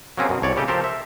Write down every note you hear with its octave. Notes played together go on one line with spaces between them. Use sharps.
F#3 A#3 C4 C#4 G#4
F#2 B2
C2 C#5 D5
A2 C#3 G4 A4 D#5
F3 G4 A4 A#4 C5
E5